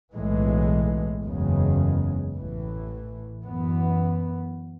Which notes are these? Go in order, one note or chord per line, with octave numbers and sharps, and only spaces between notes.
B1 A2 E3 G#3
F#1 E2 C#3 G#3
A1 A2 E3
F#2 E3 B3